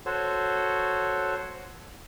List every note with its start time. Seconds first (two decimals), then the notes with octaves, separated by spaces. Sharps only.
0.06 F#4 A4 C5 C#5